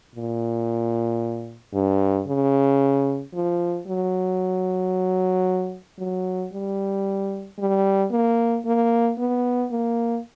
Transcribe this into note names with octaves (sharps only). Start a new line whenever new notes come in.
A#2
G2
C#3
F3
F#3
F#3
G3
G3
A#3
A#3
B3
A#3